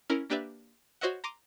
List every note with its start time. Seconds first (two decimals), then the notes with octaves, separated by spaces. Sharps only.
0.10 C#4 E4 A#4
0.30 A#3 D4 G4 B4 D5 E5
1.01 F#4 C5 C#5 D#5 E5 F#5
1.24 A#5 C6 D6 D#7